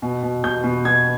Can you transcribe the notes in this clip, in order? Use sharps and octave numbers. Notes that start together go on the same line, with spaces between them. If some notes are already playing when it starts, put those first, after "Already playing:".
B2
B2
B2 G6
B2
B2 G#6